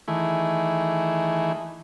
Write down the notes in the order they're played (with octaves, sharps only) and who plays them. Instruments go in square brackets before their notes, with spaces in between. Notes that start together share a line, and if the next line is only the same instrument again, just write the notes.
[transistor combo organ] D#3 E3 A3 E4 G#4